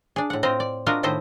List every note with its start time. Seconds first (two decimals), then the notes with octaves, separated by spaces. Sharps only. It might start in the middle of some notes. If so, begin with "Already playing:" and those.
0.16 D4 G#4
0.30 A2 F#5
0.43 C4 F4 C5 D#5 G5
0.60 D5
0.86 D4 F4 F#4 A#4 D#5
1.03 A2 D#3 E4 A4 C5 D#5